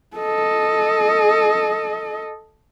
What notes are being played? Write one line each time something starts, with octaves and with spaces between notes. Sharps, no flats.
A4 D#5